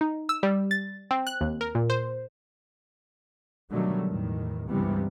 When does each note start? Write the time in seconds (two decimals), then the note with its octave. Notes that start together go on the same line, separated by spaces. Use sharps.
0.01 D#4
0.29 E6
0.43 G3
0.71 A6
1.11 C4
1.27 F#6
1.41 D#2
1.61 A#4
1.75 A#2
1.90 C5
3.70 B2 D3 D#3 F#3 G3 A3
4.06 E2 A2 D#3
4.67 C#2 G2 C3 E3 G3 B3